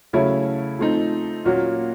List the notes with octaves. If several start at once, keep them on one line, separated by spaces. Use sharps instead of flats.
C#3 F#3 A3 C#4 E4
F3 A3 C4 D#4
A#2 F#3 A#3 C#4 F#4